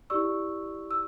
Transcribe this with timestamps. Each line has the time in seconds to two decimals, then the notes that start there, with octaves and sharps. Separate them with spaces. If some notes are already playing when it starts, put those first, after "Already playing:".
0.10 E4 G4 D5 C#6 E6
0.91 E6